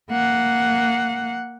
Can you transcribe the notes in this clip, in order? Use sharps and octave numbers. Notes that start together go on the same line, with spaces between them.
A#3 F#5